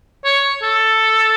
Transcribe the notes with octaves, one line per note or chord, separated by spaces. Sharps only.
C#5
A4